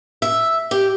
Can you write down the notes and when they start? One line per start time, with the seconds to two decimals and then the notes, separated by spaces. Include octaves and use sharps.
0.22 E5
0.71 G4